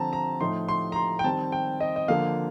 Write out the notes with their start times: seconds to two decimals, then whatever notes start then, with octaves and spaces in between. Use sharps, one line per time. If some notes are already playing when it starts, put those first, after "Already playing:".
Already playing: D3 F3 C4 A5 A#5
0.13 A#5
0.41 A2 F3 A3 D#4 C6
0.69 C6
0.92 A#5
0.96 C6
1.19 G5
1.24 D#3 G3 C4 A5
1.52 G5
1.81 D#5
1.96 D#5
2.08 D3 F3 A#3 F5